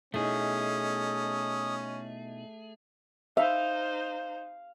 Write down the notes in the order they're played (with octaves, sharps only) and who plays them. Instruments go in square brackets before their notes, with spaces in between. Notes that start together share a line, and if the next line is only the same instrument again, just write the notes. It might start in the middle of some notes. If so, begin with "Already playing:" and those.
[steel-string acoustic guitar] B2 D#4 E4 [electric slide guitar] A3 G#4 [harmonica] C#4 [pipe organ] D#6
[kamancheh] D#4 C5 [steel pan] E5 [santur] F5